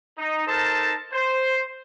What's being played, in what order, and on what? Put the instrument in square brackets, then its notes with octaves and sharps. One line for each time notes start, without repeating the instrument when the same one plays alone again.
[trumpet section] D#4
D#4 A4 A#4 C5 A5
C5